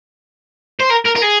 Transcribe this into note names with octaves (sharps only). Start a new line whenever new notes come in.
C5
A#4
A#4
A#4
G#4